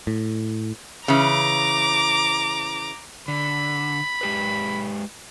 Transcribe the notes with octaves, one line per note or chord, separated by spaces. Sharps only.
A2
C#3 E3 A#5 D6
D3 B5
G#3 G4 B4